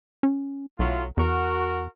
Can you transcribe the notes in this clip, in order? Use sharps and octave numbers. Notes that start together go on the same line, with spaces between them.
C#4
B1 A2 F#3 F4
E2 F#4 A#4